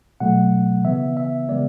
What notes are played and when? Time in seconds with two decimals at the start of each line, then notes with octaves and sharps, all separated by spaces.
0.20 B2 F#3 A3 F#5
0.84 C#3 E3 B3 E5
1.17 E5
1.49 C#3 G#3 B3 D5